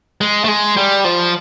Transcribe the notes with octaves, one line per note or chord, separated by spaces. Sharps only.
G#3
A3
G#3
G3
F3